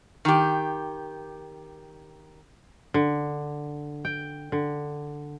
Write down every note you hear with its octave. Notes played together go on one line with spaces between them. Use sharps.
D#3 G4
D3
G5
D3